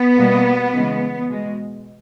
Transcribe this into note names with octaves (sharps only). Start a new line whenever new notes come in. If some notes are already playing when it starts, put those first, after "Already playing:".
Already playing: B3
B2 G3 A#3
C#3 E3 G#3
B2 G#3